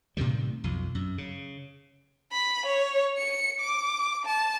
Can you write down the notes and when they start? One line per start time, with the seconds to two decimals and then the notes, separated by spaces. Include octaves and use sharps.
0.17 A2 C3 D#3 G3
0.64 B1 F2
0.95 F#2
1.18 C#3
2.32 B5
2.66 C#5
3.17 C#7
3.60 D6
4.25 A5